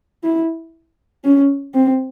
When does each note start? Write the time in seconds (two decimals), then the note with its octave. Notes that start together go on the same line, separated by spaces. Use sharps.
0.24 E4
1.24 C#4
1.74 C4